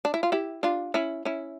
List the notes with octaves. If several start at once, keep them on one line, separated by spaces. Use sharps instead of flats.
D4
E4
F4
E4 G4
D4 F4
C#4 E4
C#4 E4